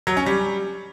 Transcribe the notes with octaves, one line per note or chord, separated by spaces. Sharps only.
F#3
C#4
G3